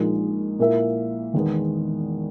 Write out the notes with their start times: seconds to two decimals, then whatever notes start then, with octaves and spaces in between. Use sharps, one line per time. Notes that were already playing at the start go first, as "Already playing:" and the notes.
Already playing: A#1 A#2 G#3 D#4 A#4
0.59 A#2 A#3 E4 A#4 E5
1.34 E2 D#3 G#3 B3